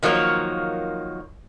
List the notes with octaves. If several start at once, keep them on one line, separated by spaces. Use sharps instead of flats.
D#3 F3 F#3 A#3 C#5